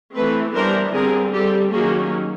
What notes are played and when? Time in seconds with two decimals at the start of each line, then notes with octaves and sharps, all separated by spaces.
0.15 E3 A3 C4 A4 B4
0.55 E3 G3 B3 D4 A#4 C5
0.94 D3 G3 C4 G#4 A#4
1.34 G3 C4 G4 A4
1.73 D#3 F#3 A#3 C#4 F#4 G#4